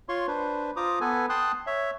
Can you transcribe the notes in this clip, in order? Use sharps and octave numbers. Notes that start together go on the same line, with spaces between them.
F4 C#5 C6 C#6
D4 B4 C5
F4 C5 A#5 D6 D#6
B3 A4 B4 G#5
G5 A5 C6 D#6 F#6
C#5 E5